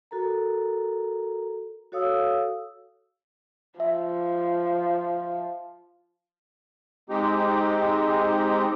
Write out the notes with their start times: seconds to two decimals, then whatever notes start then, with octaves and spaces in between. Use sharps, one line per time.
0.11 F#4 A4 A#4 A#5
1.92 F#4 A4 C#5 F5 D#6 E6
3.80 F3 E5
7.10 G#3 C4 D#4 G4